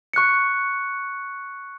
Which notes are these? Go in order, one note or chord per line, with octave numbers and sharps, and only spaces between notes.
C#6 F#6 C#7